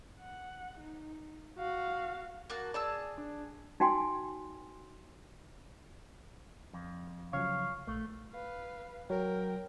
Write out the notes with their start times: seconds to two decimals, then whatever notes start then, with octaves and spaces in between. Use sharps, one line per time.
0.21 F#5
0.80 D#4
1.59 F#4 F5
2.50 A#3 F#4 A5
2.74 G#4 D5 A5 E6
3.18 D4
3.80 D#4 F#4 G5 G#5 C6
6.73 F2
7.33 C#3 F3 F#3 C#5 F5
7.87 A#1 A3
8.32 B4 F5
9.10 F#3 A#4 G5